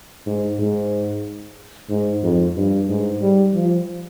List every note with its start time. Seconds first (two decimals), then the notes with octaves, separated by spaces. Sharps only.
0.26 G#2
0.58 G#2
1.90 G#2
2.23 F2
2.56 G2
2.88 G#2
3.21 G3
3.54 F3